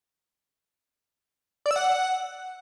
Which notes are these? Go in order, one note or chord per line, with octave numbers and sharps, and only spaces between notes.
D5
E6
F#5